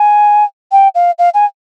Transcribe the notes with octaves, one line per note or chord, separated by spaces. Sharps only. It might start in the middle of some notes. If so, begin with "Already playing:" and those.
Already playing: G#5
G5
F5
F5
G#5